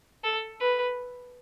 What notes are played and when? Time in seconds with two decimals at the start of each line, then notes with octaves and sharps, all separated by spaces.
0.24 A4
0.60 B4